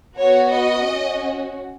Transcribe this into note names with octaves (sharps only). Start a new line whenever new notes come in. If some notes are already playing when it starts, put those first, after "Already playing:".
B3 F#4 C#5
D#5
C#4 F#4